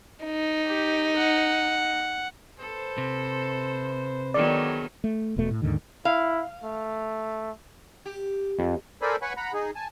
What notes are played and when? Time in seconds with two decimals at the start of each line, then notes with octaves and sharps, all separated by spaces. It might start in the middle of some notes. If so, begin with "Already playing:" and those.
0.23 D#4
0.65 G4
1.16 F#5
2.59 A4 B4 C5
2.98 C3
4.34 D3 D#3 F#3 B3 G#4 D5
5.04 A3
5.36 E1 E2 B2 A3
5.51 A2
5.62 D#2 G#2 D3 D#3
6.05 E4 F5
6.64 A3
8.06 G4
8.59 F2
9.02 A4 A#4 C5 D5 G#5 B5
9.22 B4 C#5 F#5 G#5 B5 C#6
9.37 F#5 A#5 B5
9.54 D#4 G#4
9.75 G#5 A5